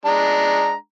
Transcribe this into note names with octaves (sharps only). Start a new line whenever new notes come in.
G#3 D4 A#5